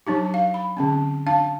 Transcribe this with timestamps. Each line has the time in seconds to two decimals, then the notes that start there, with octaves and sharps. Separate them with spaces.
0.07 F#3 D4 D#4 G4
0.34 F5
0.54 B5
0.77 D3 C4 C#4
1.27 D4 F5 A5